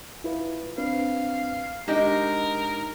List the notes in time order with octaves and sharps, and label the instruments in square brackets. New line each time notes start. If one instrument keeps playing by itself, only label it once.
[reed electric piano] E4 F4 B4
[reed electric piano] C4 D4 B4 [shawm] F5
[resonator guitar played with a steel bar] G#3 G4 D#5 [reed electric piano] D4 D#4 [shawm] A#4